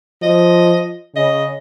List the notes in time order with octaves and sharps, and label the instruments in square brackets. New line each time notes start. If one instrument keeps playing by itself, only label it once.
[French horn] F3 [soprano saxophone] D#5
[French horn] C#3 [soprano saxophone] D#5